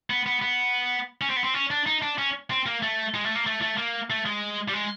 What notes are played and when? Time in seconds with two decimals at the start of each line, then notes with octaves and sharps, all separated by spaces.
0.10 B3
0.26 B3
0.42 B3
1.21 C#4
1.30 C4
1.36 B3
1.44 C4
1.54 C#4
1.71 D4
1.86 D#4
2.02 D4
2.18 C#4
2.50 C4
2.66 A#3
2.82 A3
3.14 G#3
3.24 A3
3.35 A#3
3.46 A3
3.62 A3
3.77 A#3
4.10 A3
4.26 G#3
4.68 G3
4.73 G#3